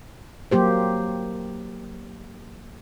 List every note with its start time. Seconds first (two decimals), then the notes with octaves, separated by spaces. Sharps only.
0.51 F#3 A#3 G4 C5